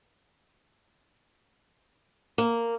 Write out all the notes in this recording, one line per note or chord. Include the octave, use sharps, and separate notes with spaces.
A#3